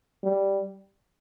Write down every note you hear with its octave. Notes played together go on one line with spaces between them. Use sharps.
G3